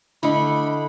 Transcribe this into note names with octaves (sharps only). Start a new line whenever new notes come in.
D3 A3 E4 D#5 B5